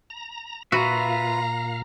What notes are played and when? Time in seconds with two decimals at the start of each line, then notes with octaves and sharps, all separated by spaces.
0.10 A#5
0.72 A#2 F4 F#4 B4 E5 F5 A#5